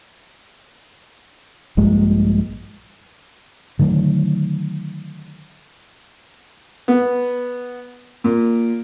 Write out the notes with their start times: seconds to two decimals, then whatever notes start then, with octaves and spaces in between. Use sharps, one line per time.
1.77 A#1 G2 A#2 G#3
3.79 D3 D#3 F#3 A3
6.88 B3
8.24 A#2